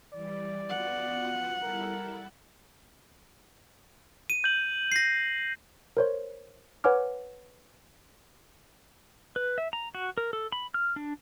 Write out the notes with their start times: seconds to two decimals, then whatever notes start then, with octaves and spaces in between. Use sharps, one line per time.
0.13 E3 G3 D5
0.70 B3 F4 F#4 F#5
1.62 G3 E4 A4 A#4
4.30 D#7
4.44 G6 F#7
4.92 A#6 C7
5.97 A#4 C5 C#5
6.84 B4 C#5 F#5 G#5 D6 F6
9.36 B4
9.58 E5
9.73 A#5
9.95 F#4
10.18 A#4
10.33 A4
10.52 B5
10.74 F6
10.96 D4